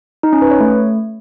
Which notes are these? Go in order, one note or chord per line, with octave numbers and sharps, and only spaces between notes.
D#4
C#4
B4
C#5
A3